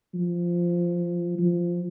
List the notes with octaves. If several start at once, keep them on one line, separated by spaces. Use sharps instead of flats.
F3
F3